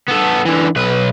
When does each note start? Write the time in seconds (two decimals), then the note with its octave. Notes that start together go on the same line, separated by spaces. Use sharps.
0.09 B3 A4
0.46 D3 E3
0.76 B1 B4